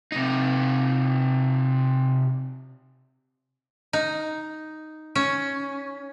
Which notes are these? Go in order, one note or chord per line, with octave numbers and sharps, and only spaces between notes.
C3 D#4
D#4
C#4